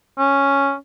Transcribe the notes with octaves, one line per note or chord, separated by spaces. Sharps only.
C#4